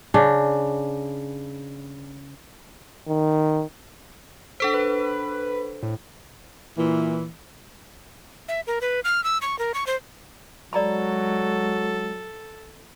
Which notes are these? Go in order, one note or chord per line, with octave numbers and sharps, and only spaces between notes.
C#3 D4
D#3
D4 A4 C5 B6
B4
A2
A#2 E3
E5
A#4
B4
F6
E6
C#6
A#4
C#6
C5
F#3 G#3 A4 D5 A#5 B5